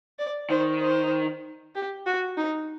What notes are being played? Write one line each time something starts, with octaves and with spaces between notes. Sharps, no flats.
D5
D#3 C5
C5
G4
F#4
D#4